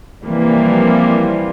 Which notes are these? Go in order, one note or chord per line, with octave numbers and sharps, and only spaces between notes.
C3 E3 F3 G3 A#3